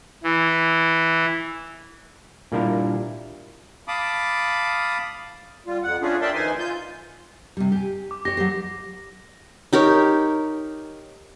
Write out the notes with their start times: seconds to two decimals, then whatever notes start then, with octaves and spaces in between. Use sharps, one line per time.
0.24 E3
2.52 A#2 G3 A#3 D4 E4 A#4
3.88 F5 A5 B5 D6 D#6
5.66 G3 F4
5.84 F2 F#5
6.02 A3 C#4 D4 F4 G#4
6.21 A#4 D5 E5 G5 A5 C6
6.34 D2 E3 D#4 C5 G#5 C6
6.59 F4 G6
7.57 C3 G3
7.72 G4 G#5
8.11 D6
8.25 G4 C#5 A#6
8.37 F#3 G4 C5
9.73 D#4 G4 A#4 C#5